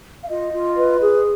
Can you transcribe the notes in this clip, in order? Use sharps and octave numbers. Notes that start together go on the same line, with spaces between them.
F5
F4 D#5
F4
B4
G#4